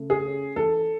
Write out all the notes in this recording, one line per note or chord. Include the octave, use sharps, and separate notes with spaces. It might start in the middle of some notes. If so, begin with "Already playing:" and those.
Already playing: C#3 A3
G#4
C#4
E3 A4